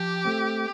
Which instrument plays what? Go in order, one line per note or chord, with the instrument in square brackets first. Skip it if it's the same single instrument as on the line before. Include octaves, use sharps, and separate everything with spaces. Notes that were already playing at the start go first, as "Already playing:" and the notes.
Already playing: [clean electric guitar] F3 [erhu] G4
[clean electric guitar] A3 C4